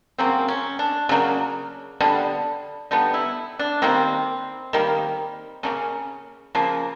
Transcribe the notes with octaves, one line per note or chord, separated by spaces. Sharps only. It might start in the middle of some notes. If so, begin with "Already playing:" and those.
C#3 F#3 A#3 C4
C#4
D4
C#3 F#3 A#3
D3 G3 B3
D3 G3 B3 D#4
E4
D4
D#3 G3 A#3 C4
D#3 G3 A#3
C#3 F3 A#3 C#4
C#3 F3 A#3